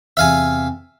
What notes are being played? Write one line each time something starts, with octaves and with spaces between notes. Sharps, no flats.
E2 C3 E5 F5 G#5